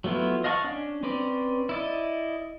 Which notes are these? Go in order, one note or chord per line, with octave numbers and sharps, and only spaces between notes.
F#3 A3 B3 E4 F4
D#5 F5 F#5 A5 C#6
C#4 D4
C4 C#4 B4 C5 D5
E4 D5 D#5